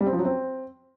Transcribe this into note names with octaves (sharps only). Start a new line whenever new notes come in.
G3
C4
F3
F#3
C4